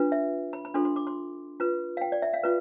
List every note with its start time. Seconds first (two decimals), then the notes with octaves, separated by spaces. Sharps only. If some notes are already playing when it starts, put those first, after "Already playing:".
Already playing: D4 F4 B4
0.12 E5
0.53 B5
0.65 B5
0.74 D4 F4 A4 C6
0.85 C6
0.96 D6
1.07 C6
1.60 F4 B4
1.97 F5
2.01 G5
2.12 D5
2.22 E5
2.33 F5
2.44 F4 B4